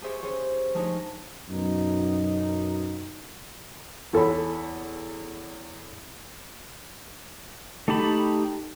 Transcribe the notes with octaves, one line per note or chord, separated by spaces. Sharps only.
G4 G#4 C5 D5 E5 C#6
C#4 G4 G#4 C5 C#5
F3 G#3 A3 D4 D#4 C#5
F#2 B2 D#4
E2 A4 C#5 B5
A3 D#4 G4 A5 B5